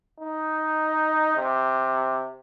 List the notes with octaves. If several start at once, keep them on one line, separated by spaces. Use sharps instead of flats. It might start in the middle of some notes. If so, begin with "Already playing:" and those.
D#4
C3